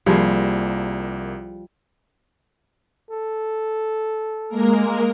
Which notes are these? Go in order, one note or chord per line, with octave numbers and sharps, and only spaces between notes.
C2 F3 G3 A#3 G#4
A4
G#3 A#3 A#4